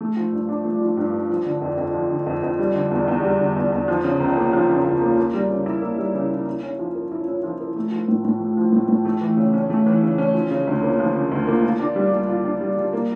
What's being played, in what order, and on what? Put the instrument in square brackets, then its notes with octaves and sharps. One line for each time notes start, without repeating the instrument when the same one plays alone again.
[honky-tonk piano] A3
F3
G2
D4
A3
F3
G2
D4
F3
D3
F2
F2
F3
D3
F2
F2
G3
D3
E2
E2
G3
D3
E2
E2
F3
C#3
C#2
A#3
F3
C#3
C#2
A#3
A#3
G3
C#3
E4
A#3
G3
C#3
E4
E4
C#4
F3
A#4
E4
C#4
F3
A#4
A3
F3
A2
A2
A3
F3
A2
A2
A3
E3
C#3
C#4
A3
E3
C#3
C#4
F3
C#3
D2
A#3
F3
C#3
D2
A#3
F4
D4
G3
G3
F4
D4
G3
G3
A#3